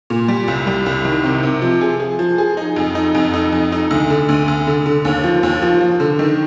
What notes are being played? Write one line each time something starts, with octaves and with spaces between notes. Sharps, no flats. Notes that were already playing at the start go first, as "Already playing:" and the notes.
A#2
G3
C2
G3
C2
D#3
C3
C3
F3
G#4
G#4
F3
G#4
D#4
F2
D#4
F2
D#4
F2
D#4
D2
D3
D2
D2
D3
D3
D#2
F3
D#2
F3
F3
D3
D#3